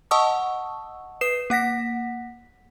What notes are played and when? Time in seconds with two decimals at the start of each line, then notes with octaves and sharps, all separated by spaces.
0.11 D#5 F#5 A5 C#6 D#6 E6
1.21 B4 D#6 C7 E7
1.50 A#3 F#5 A#6 B6